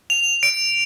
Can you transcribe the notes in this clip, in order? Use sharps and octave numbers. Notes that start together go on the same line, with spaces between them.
F7
D7